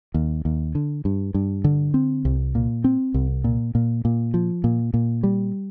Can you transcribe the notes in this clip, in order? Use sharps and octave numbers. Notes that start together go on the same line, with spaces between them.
D#2
D#2
D3
G2
G2
D3
C4
C2
A#2
C4
C2
A#2
A#2
A#2
F3
A#2
A#2
G3